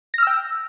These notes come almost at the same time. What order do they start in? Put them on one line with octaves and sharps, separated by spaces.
A#6 F6 E6 G5